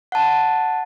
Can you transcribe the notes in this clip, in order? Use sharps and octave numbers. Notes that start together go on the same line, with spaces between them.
F#5 A5